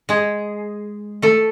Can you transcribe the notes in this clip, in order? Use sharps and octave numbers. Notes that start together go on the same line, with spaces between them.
G#3 G#4
A3 A4